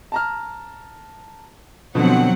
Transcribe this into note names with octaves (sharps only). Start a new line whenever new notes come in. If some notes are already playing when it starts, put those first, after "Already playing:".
A5 A#5 F6
B2 D3 F3 F#3 C4 F#5